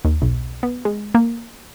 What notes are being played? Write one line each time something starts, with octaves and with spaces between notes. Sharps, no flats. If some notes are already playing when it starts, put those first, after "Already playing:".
D#2
B1
B3
G#3
A#3